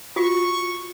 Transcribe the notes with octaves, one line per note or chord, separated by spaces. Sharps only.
F4 F#4 C#6